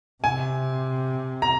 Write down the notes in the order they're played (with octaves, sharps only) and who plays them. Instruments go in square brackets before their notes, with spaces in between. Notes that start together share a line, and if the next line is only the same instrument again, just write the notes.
[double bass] C3 [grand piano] G#5
[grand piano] A#5